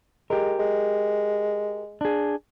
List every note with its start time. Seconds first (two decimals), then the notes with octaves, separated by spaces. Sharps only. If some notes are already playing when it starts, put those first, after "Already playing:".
0.30 G#3 G4 A#4
0.59 G#3
2.01 D4 G#4